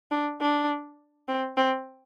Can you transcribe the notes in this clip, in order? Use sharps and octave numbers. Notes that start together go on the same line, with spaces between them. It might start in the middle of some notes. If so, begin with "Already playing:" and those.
D4
D4
C4
C4